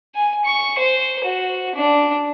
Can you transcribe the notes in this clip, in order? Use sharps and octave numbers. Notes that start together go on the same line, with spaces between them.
G#5
C#6
C5
F#4
D4